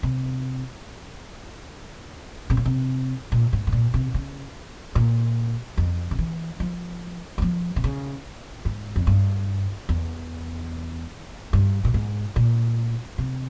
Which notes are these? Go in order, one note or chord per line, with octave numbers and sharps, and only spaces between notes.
C3
C3
A#2
C3
A#2
G#2
G#2
A#2
C3
C#3
A#2
F2
C#3
E3
F3
G3
F3
C3
C#3
G#2
F2
G2
E2
G2
A#2
G#2
A#2
C3